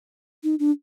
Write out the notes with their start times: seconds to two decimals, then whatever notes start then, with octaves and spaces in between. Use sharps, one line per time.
0.44 D#4
0.60 D4